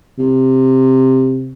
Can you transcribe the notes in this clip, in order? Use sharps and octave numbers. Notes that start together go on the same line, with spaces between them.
C3